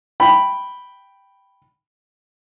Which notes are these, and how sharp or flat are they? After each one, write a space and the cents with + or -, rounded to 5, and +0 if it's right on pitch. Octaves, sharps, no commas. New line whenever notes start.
G5 +0 B5 +0